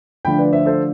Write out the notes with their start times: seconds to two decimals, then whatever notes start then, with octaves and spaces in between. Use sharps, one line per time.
0.25 D3 F3 A3 D4 G5 B5
0.38 B4 D5
0.52 C5 E5
0.66 A4 C5